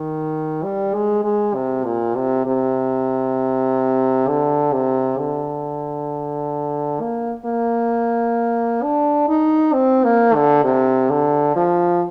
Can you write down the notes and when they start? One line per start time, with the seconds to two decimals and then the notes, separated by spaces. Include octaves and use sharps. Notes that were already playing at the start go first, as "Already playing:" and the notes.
Already playing: D#3
0.63 G3
0.94 G#3
1.24 G#3
1.55 C3
1.85 A#2
2.16 C3
2.46 C3
4.28 D3
4.73 C3
5.19 D3
7.01 A#3
7.45 A#3
8.83 D4
9.28 D#4
9.73 C4
10.04 A#3
10.34 D3
10.64 C3
11.10 D3
11.56 F3